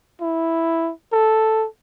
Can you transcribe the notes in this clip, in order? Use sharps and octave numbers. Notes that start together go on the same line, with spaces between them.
E4
A4